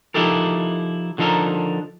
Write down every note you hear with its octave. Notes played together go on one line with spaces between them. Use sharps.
F3 D#4 E4 G4 A4 A#4
D3 F3 D#4 A4 A#4